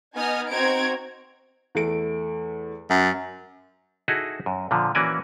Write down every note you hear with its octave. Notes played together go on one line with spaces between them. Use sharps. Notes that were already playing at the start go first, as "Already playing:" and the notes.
B3 D#4 D#5 G#5 D#6 F6
C4 D#4 F#4 A#5 G#6 D7
E2 A3 D7
F#2
D#4 E4 F#4 G#4 A4
F#2
A#2 D3 F3
E3 A#3 C#4 F#4 D5 G#5